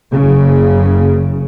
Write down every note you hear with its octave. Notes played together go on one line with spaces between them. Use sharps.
F#1 C#3